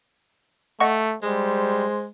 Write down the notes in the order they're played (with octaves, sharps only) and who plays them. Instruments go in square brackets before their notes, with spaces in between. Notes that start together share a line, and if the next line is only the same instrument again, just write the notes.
[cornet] A3 [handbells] D#5 F#5 C#6
[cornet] G3 [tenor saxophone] G#3 [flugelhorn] C5